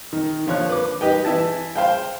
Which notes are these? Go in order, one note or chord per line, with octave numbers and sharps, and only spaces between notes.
D#3
D3 F3 C#5 F#6
B4 D6
D#4 G4 B4 G5
E3 E4 A5
C5 F5 G5